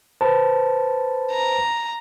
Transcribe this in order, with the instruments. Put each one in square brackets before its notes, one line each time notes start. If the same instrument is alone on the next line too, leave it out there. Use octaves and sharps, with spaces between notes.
[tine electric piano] B4 C5 A5
[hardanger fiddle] A#5